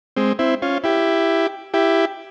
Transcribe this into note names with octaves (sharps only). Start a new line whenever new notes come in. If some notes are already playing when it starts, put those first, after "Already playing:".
G#3 C4
C4 E4
C#4 F4
E4 G4
E4 G4